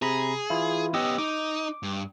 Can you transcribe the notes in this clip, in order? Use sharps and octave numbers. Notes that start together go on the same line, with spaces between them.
C3 G#4 A#5 B5
E3 E4 F4
B3 C#4 G4 D#5 E6
D#4 D6
G2